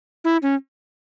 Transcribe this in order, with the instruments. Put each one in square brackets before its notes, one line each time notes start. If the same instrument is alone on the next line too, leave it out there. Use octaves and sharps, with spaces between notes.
[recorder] E4
C#4